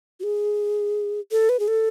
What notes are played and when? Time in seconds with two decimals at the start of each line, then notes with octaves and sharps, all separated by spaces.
0.20 F#4
0.23 G#4
1.32 A4
1.49 B4
1.60 G#4
1.68 A4